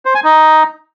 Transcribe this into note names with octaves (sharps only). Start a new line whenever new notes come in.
C5
G#5
D#4